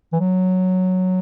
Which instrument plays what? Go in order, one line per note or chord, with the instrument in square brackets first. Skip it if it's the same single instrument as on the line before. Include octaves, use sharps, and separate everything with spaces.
[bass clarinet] E3
F#3